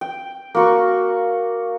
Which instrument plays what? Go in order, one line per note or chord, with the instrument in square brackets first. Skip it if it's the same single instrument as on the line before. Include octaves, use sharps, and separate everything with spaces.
[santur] G5
A#3 F#4 C#6